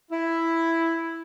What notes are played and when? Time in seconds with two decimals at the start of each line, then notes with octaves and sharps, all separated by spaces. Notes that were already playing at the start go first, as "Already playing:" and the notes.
0.11 E4